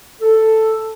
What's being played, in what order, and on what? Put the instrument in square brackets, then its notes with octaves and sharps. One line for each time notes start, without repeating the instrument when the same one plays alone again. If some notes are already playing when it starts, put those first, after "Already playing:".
[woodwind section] A4